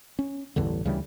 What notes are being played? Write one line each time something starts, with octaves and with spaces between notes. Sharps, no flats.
C#4
A1 E2 G2 D3
D2 C#3 E3 G3